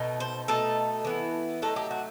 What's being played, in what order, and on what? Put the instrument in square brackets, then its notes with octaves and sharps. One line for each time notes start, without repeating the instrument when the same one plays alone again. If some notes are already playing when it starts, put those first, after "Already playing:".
Already playing: [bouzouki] B2 A3 D#4
C5
B2 A3 D#4 A4
E3 B3 E4
F#3 A3 D#4 A4
G4
F#4